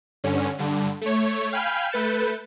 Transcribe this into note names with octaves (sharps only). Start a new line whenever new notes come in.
G2 D3 C#4
G2 D3
A3 C#5
F5 G5 G#5 B5 F6 G6
A3 B4 G6 A6 C#7 E7